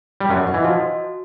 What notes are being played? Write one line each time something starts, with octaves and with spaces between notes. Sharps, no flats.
G3
F#2 F#3 F#5
D#5
E3
F3 F#4